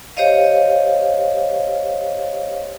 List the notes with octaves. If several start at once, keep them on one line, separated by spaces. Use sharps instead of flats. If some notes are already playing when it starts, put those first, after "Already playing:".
G4 C5 C#5 D#5 F5